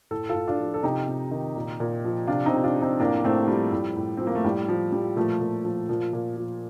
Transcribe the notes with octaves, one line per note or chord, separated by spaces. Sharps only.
A2 A4
F4 A4
A2
D4 F4
F3
A4
C3 D#4 G4
C3
D#3
A#2
A#2
F3
C3 D4 F4
C4 D#4
C3
D4 F4
F3
C4 D#4
A2 A#3 D4
A2 A3 C4
F3 G3
A2
A2
F3 C4
A#3
A3
A2 G3
A2 F3
F3 G3
A#2 F3 A3
A#2
F3
A#2 F3
A#2
F3